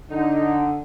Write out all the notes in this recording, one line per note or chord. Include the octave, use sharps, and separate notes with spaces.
D3 D#4